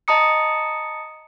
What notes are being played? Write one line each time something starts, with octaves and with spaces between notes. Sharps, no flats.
D#5 A5 A#5 D#6 C#7